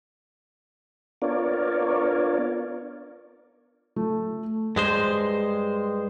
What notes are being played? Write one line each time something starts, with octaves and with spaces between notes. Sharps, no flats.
B3 D4 F4 A#4 C#5 D5
A3
G2 G#3 C5